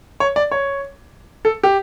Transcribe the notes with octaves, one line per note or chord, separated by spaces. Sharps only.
C#5
D5
C#5
A4
G4